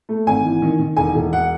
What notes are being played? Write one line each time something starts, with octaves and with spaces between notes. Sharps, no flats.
A3
G#1 G#5
E3
D#3
D#3
E1 G#5
E1
F#5